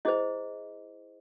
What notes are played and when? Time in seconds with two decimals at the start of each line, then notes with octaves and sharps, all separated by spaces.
0.05 E4 G#4 C5 D#5